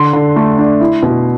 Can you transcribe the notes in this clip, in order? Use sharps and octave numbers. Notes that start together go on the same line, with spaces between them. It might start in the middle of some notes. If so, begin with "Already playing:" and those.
Already playing: D3 C6
D3
A3
D4
E4
B2